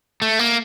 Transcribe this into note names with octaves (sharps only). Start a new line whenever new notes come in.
A3
A#3